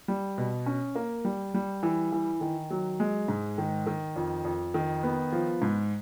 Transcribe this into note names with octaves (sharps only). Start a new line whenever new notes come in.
G3
B2
C#4
A#3
G3
G3
E3
E3
D#3
F#3
G#3
G#2
D#3
D#3
F2
F2
D#3
B3
F3
G#2